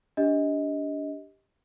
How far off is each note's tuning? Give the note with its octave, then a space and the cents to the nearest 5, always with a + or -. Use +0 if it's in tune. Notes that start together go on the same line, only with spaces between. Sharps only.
D4 -25 G4 +0 D#5 +20